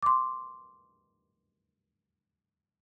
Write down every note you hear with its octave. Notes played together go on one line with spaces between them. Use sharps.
C6 D6